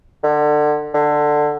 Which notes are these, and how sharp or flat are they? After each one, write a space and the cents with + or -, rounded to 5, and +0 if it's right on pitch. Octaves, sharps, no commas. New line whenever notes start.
D3 +30
D3 +15